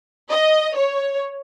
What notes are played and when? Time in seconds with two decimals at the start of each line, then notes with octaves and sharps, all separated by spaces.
0.29 D#5
0.75 C#5